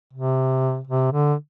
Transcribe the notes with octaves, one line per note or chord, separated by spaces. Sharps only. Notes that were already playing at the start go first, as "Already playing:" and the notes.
C3
C3
D3